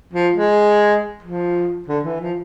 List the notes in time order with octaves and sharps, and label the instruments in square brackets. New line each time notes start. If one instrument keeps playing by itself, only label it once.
[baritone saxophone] F3
G#3
F3
D3
E3
F3